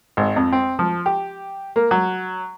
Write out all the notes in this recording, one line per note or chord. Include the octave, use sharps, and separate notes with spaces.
G#1
F2
C4
F3
G4
A#3
F#3